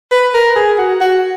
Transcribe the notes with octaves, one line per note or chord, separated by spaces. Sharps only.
B4
A#4
G#4
F#4
F#4